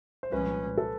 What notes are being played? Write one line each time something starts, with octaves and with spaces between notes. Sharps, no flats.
C5
C2 A#2 F3 G#3 C#4 B4
A4